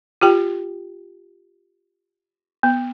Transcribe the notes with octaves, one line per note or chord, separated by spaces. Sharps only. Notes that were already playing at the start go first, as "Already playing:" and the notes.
F4 G4 G5
B3